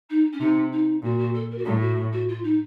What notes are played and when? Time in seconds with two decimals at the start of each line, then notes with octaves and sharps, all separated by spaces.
0.09 D#4
0.32 C#4
0.40 C3 D#4
0.72 D#4
1.03 A#2 F#4
1.18 F#4
1.33 A4
1.50 A#4
1.57 F#4
1.65 A2 A4
1.81 F#4
2.12 F#4
2.28 F4
2.43 D#4